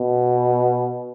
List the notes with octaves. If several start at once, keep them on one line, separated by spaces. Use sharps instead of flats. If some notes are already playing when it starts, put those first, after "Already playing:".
Already playing: B2